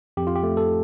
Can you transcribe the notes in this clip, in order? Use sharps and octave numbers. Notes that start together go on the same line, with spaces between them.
F2 G4
F4
G4
A3
A4